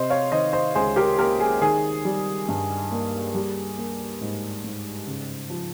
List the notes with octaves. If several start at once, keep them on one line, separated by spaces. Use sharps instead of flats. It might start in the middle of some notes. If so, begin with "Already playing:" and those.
Already playing: C3 C5 D#5
C#5 F5
D#3 C5 D#5
C5 D#5
C#2 G#4 C5
G4 A#4
A#3 G4 A#4
G#4
D#3 G#4
G3
G2
A#3
G3
A#3
G#2
G#2
C#3
F3